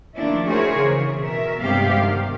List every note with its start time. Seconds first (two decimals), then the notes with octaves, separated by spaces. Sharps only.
0.15 D#3 F3 A3 A#3 D4 E4
0.47 E4 F#4 G#4 A#4 C5 C#5
0.76 C#3 E3
1.20 B2 A#4 E5
1.61 G2 C3 G#3 B3 G4 F5
2.00 D#3